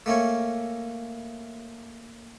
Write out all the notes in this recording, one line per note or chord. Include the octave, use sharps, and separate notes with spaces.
A3 A#3 C#4 C#5